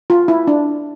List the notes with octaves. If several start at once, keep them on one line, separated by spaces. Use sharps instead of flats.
F4
E4
D4